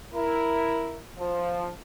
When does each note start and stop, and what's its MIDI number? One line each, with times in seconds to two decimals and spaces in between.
0.13 0.98 64
0.13 0.98 70
1.18 1.67 53